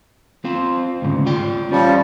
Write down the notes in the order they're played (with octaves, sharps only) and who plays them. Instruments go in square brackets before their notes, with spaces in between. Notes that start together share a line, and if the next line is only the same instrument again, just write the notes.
[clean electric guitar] C4 F4 C5
D2 G#2 C#3
F4 D5 G5
[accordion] F3 G3 [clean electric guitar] C#4 G4 C#5